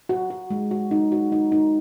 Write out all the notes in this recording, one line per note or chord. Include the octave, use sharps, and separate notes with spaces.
F#4
F#4
G#3
F#4
D#4
F#4
D#4
D#4